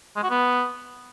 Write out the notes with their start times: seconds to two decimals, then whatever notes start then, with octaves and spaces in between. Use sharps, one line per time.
0.16 G#3
0.23 F#4
0.30 B3